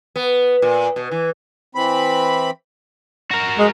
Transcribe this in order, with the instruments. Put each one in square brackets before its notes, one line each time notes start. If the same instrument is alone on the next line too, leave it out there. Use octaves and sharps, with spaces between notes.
[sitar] B3
A#2
B2
E3
[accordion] E3 C4 B5
[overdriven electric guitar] F#4 A#4
[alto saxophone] G#3